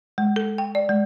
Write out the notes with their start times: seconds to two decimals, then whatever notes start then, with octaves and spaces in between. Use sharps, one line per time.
0.18 G#3
0.36 A4
0.58 G5
0.75 D5
0.89 G#3